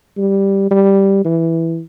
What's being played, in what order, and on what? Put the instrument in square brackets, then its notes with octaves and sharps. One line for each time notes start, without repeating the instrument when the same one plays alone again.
[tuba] G3
G3
E3